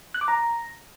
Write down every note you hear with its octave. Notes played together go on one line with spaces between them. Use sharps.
F#6
D6
A#5